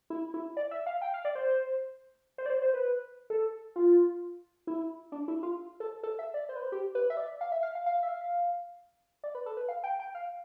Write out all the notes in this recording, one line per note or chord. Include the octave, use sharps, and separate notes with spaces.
E4
E4
D5
E5
F5
G5
F5
D5
C5
C5
D5
C5
C5
B4
A4
F4
E4
D4
E4
F4
A4
A4
E5
D5
C5
B4
C5
G4
B4
E5
D5
F5
E5
F5
F5
F5
E5
F5
D5
B4
A4
B4
F5
G5
G5
F5